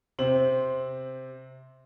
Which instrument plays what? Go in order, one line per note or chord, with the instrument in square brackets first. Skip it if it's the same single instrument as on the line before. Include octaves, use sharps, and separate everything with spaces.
[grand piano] C3 C4 F#7